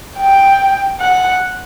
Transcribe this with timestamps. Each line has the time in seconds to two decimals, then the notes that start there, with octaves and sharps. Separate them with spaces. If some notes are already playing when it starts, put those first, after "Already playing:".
0.18 G5
1.01 F#5